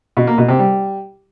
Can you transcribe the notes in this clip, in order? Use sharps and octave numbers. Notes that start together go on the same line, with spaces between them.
B2
A#3
B2
C3
G3